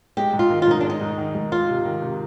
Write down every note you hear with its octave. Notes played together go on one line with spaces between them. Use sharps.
G#3 G4
G#2
F4
D#3
F4
G#2 D#4
G#3 D4
D#4
G#2
D#3
G#2
G#3 F4
C3
D#3
C3